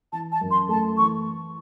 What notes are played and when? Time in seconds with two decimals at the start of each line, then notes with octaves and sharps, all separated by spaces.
0.12 E3 A5
0.31 A5
0.41 F#2
0.50 C6
0.69 A3 A5
0.97 E3 C#6